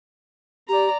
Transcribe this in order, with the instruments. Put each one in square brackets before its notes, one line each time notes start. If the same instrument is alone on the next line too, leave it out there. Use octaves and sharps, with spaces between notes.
[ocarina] G4 [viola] D5 A#5